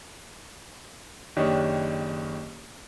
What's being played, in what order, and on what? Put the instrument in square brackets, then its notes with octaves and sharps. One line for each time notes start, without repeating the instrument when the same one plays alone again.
[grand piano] F#1 D#3 D4 G4 C#5